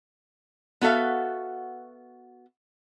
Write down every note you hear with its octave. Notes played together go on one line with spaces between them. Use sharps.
B3 F#4 A4 E5 F5